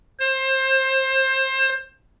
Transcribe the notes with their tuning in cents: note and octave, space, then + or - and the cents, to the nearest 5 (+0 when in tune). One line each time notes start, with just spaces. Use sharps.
C5 +25